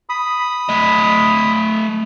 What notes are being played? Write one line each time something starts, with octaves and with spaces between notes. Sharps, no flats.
B5 D#6
A3 D#5